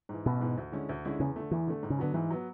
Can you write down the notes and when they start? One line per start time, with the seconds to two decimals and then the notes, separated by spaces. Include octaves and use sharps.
0.09 G#2 E3
0.26 A1 B2
0.41 G#2 E3
0.57 D2
0.72 D3 G#3 C#4 E4
0.89 D2
1.05 D3 G#3 C#4 E4
1.20 E2 C#3
1.36 D3 A3
1.51 E2 E3
1.67 D3 A3
1.83 G#2
1.90 C#3
1.99 D3 F#3 B3
2.14 G#2 E3
2.30 F#3 B3